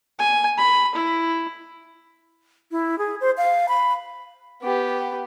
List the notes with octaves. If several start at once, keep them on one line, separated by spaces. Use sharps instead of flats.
G#5
B5
E4
E4
G#4
C5
F5
B5
B3 G4